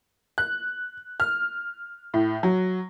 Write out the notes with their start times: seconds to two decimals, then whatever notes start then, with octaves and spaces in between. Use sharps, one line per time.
0.38 F#6
1.20 F6
2.14 A2
2.43 F#3